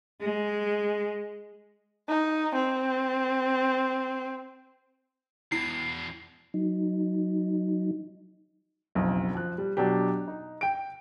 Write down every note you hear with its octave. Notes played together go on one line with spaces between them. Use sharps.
G#3
D#4
C4
E2 B2 E4 C7
F#3 D#4
F#1 B1 F2
F3 F#6
G3
B2 F#3 D4 G4
D#4
G5 D7